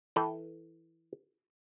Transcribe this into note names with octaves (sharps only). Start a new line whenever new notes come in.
E3 A4 B4 G5